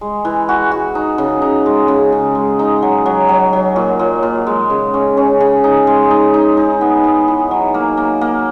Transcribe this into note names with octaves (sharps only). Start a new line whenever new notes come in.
G#3
E3
F#4
F#4
D#4
C#3
D#4
G#3
C#3
C#3
G#3
D#4
F#3
F#3
F#3
F#3
A#2
A#2
A#2
G#3
C#3
C#4
C#4
C#3
D#4
G#3
D#4
D#4
D#4
B3
D#4
E3
F#3
A#3
A#3
A#3